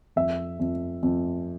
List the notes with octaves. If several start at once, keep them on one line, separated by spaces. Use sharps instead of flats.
F2 E5
F2
F2